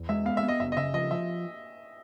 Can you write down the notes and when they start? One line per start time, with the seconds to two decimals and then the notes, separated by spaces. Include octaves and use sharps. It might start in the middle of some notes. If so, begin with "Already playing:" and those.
Already playing: E2
0.09 G#3 E5
0.25 B3 F5
0.37 E5
0.43 B3
0.48 D#5
0.60 F#1 E5
0.72 D#5
0.77 C#3 E5
0.94 F3 D#5
1.11 F3 E5